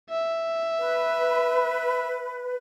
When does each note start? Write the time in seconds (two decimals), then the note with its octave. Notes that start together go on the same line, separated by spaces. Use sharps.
0.10 E5
0.79 B4